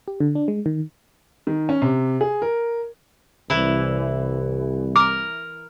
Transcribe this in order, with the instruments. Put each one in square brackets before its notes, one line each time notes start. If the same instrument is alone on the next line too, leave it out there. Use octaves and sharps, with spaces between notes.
[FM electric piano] G4
D3
D4
G#3
D#3
[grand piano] D#3
C#4
C3
G#4
A#4
[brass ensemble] C2 [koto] E3 E4
[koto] A#4 [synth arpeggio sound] D6